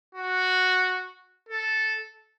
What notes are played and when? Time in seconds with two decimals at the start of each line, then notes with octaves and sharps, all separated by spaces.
0.15 F#4
1.49 A4